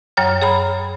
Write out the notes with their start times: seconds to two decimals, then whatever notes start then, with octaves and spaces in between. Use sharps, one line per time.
0.17 F#2 F#3 C#5 G5 F6
0.42 G#4 C#5 A#5 B5